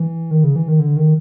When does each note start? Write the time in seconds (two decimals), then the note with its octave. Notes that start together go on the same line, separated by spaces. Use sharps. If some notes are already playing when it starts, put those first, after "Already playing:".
Already playing: E3
0.31 D#3
0.44 C#3
0.56 E3
0.68 D#3
0.80 D3
0.96 D#3